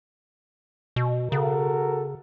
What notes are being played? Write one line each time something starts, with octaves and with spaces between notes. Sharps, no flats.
B2
C#3 F#4 A4 A#4